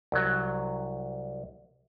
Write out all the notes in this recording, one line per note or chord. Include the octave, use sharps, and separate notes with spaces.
C2 F#3